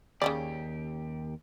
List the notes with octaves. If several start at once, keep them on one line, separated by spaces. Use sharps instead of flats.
D#2 C#3 C#4 G4 D5